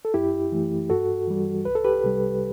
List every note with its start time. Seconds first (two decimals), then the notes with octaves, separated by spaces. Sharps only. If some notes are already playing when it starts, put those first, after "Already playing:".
0.05 A4
0.14 F#2 E4 G4
0.52 E3 A3
0.90 G2 F#4 A4
1.28 E3 G3
1.65 C2 B4
1.75 A4
1.84 G4 B4
2.04 C3 G3